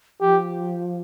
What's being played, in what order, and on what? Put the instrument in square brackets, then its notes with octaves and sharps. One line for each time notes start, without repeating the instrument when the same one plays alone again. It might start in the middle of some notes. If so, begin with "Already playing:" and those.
[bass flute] F3 [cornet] G4